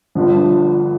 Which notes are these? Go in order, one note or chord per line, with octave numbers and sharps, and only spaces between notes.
G1 G2 D3 F3